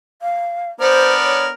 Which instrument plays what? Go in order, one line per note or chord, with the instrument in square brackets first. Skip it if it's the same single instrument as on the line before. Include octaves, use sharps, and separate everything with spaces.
[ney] F5
[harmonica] B3 D4 A#4 [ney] C5
[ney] C#5